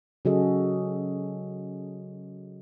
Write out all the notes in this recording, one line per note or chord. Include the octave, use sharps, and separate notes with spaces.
C#3 F#3 F#4 G#4 A4 D#5